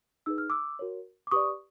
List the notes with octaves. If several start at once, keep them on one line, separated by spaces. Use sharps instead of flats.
D#4 G#4 B4 E6
F6
D6 E6
F#4 A#4 C#5
D6
G4 B4 D5 C#6 D#6